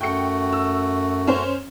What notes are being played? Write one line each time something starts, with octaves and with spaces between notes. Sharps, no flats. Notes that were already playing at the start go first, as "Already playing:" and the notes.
F#2 A3 F#4 G5 C#7
E6
C#4 C5